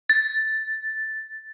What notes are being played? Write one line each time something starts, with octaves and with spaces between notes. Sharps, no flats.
A6